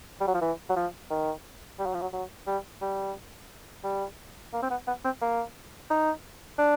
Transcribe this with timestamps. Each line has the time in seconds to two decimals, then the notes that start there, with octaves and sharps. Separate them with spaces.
0.21 G3
0.27 F#3
0.34 F3
0.41 E3
0.70 F#3
0.76 F3
1.10 D#3
1.79 G3
1.86 F#3
1.94 F3
2.01 F#3
2.13 F#3
2.47 G3
2.81 G3
3.84 G3
4.53 A#3
4.62 C4
4.71 B3
4.87 B3
5.05 C4
5.21 A#3
5.90 D#4
6.58 D4